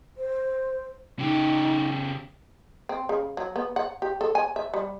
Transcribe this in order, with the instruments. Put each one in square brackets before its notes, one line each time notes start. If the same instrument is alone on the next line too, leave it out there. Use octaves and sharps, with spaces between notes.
[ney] C5
[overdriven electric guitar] C#3 G4 [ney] D#4
[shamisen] C4
C#3
F#3
B3
F#5
G4
A4
G#5
E5
G3